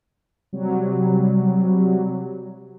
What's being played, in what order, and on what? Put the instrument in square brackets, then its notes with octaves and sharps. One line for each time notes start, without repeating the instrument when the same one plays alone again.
[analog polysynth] C3 F#3 G3